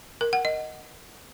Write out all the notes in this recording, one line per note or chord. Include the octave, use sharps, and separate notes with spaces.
A#4
F#5
D#5